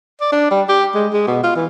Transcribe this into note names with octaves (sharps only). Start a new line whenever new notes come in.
D5
D4
G3
G4
G#3
G#3
B2
F4
E3